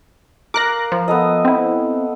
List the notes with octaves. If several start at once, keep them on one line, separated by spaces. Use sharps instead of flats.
A#4 F5 D6 F#6 A#6
F3
B3 A4 D#5
C4 E4